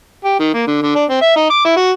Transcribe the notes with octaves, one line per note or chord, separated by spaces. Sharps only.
G4
D#3
A#3
D3
D3
D4
C4
E5
D#4
D6
E4
F#4